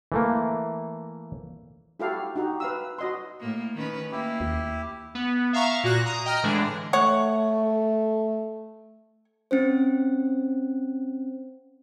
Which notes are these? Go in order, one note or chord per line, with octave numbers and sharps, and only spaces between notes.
E3 A3 A#3
E4 F#4 G4 A4 F5
D#4 F#4 G4
B4 F5 E6
F#4 D#5 C6
A2 A#3
D#3 C#4 B4
A#3 E4 G4
D#2
B3
E5 F5 A#5 C#6
A#2 F#4 F#6 A#6
A#5 D#6
D#5 G5 A#5 F6
A2 D3 E3 G#3 D4
A3 C#5 F#5
C4 C#4 C5